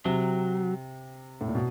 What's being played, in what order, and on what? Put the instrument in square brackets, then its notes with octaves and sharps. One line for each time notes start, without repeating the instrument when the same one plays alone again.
[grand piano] C3 [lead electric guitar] F#3
[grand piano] A2
A#2
B2